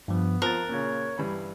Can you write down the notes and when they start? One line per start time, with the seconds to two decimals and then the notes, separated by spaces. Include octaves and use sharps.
0.08 G2 F3 B3
0.42 F3 C4 A#4 F#6 A6
0.69 A#2 C#3 C#5
1.18 G2 E3 B5